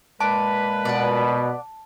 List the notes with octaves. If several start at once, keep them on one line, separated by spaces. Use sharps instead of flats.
A#2 G#3 B4 A5 D6
B2 D5 F#5